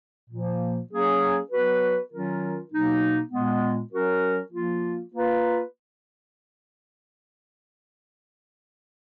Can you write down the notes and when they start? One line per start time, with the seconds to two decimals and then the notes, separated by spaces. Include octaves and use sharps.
0.30 A#2 F3 A#3
0.91 F#3 A#3 C#4 G#4
1.51 F#3 B3 F#4 B4
2.11 D#3 F#3 C#4 F4 A#4
2.71 B2 F#3 A#3 D#4
3.31 A#2 G#3 B3
3.92 F#3 C#4 F#4 A#4
4.52 F3 A#3 F4
5.12 A#3 F4 B4